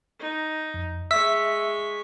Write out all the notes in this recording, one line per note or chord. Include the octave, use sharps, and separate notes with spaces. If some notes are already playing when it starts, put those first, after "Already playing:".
D#4
F2
G#3 E5 C#6 E6 B6